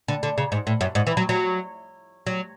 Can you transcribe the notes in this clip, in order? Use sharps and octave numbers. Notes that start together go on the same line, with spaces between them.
D3
D3
C#3
G#2
A2
F#2
G#2
E3
F#3
F#3
F#3